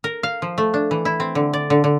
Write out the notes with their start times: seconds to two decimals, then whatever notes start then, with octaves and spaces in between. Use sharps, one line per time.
0.04 A#4
0.23 F5
0.42 F3
0.58 A3
0.74 D4
0.91 E3
1.05 E4
1.20 C4
1.35 D3
1.53 D5
1.70 D3
1.84 D3